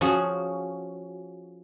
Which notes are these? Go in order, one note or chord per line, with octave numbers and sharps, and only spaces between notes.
F3 C#4 F#4 G#4